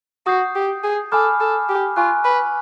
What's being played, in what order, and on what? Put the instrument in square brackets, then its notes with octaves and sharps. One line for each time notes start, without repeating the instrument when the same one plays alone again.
[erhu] F#4 [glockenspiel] D#6 G6 C7
[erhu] G4
G#4
[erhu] A4 [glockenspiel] G#5 B5 D6 F6
[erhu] A4
G4
[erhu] F4 [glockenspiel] G#5 C#6 F#6
[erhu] B4